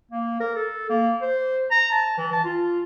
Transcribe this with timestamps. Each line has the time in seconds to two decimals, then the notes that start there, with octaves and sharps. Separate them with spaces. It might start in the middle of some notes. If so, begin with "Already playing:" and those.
0.12 A#3
0.40 A#4
0.56 A4
0.90 A#3
1.22 C5
1.71 A#5
1.91 A5
2.18 E3
2.32 A5
2.45 F4